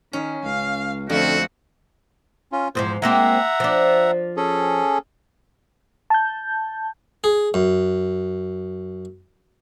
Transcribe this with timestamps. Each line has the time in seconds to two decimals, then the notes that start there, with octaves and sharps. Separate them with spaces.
0.13 D#3 C#4
0.44 C#2 F5
1.10 F2 D3 A3 C4 F#4
2.52 C#4 F4
2.75 E2 G#2 F3 C5
3.02 G#3 A#3 C4 E5 F#5 A#5
3.60 F3 D4
4.37 C#4 G#4 A4
6.10 A5 G6
7.24 G#4
7.54 F#2